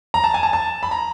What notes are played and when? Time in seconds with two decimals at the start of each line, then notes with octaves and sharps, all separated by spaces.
0.14 A#5
0.24 A5
0.34 G#5
0.43 A5
0.53 A5
0.83 B5
0.91 A#5